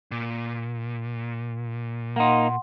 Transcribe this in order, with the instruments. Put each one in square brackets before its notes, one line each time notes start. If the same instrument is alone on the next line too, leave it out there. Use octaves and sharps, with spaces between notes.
[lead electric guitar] A#2
[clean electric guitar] A#3 D#4 [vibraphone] F#5 C6